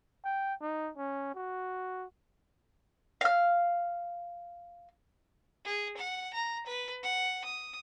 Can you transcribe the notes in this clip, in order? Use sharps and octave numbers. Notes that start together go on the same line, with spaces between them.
G5
D#4
C#4
F#4
F5 F6
G#4
F#5
A#5
B4
F#5
D#6